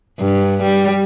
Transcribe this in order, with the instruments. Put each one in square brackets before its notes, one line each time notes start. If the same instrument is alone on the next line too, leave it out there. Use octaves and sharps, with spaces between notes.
[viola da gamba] G2
G3